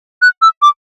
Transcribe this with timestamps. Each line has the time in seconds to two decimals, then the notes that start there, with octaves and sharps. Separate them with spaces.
0.22 F#6
0.42 E6
0.62 D6